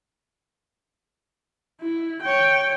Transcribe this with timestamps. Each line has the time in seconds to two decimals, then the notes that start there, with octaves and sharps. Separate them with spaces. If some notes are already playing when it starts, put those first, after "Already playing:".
1.81 E4
2.22 C#5 G5